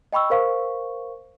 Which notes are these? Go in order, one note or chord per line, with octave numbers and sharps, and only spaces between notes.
D#5 G5 B5 C#6 E6
A#4 C5 F5 C#6